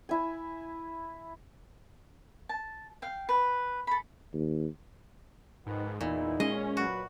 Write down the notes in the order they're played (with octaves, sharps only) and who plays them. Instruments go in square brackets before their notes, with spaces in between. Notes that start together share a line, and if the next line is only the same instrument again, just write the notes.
[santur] E4 G#5
[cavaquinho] A5
F5 G5
B4
A4 B5
[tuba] D#2
[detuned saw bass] G#2 [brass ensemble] D#3 F3 B3
[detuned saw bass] E2 [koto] A#2 [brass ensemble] D#4 E4
[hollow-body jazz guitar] G#3 [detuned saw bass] C#4 [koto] D#5
[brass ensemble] F#3 B4 [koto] F#4